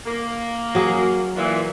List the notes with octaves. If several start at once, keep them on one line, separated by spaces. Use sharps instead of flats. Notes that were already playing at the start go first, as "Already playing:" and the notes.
A#3
F#3 G#4
A#2 E3